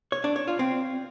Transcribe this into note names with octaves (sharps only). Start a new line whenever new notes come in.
C#5
D4
C#5
F4
C4